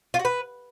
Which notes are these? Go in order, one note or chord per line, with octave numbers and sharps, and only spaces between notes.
F4
F#4
B4